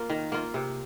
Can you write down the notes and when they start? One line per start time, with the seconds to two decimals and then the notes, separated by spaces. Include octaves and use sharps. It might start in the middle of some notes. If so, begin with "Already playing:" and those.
Already playing: A#3 F4
0.10 D#3
0.32 A#3 F4
0.54 C3